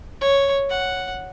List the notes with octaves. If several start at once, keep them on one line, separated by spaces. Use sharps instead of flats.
C#5
F#5